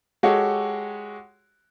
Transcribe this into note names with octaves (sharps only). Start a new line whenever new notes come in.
G#3 F#4 G4 A4 C#5